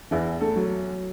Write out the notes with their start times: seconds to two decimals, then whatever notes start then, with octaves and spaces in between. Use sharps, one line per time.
0.11 E2 E3 E4
0.41 A3 A4
0.56 F#3